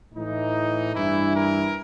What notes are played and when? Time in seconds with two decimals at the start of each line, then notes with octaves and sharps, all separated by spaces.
0.15 A2 E3 D#4
0.93 G2 E3 E4
1.33 A#4